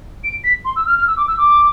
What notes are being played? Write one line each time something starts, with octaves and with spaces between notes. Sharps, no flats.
D7
B6
C6
E6
F6
F6
E6
D6
E6
D6